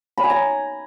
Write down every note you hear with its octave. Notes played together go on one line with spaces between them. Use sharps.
B5
G#5
A#5